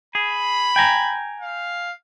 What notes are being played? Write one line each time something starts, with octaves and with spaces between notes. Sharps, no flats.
G#4 B5
G5 G#5 A#5
F5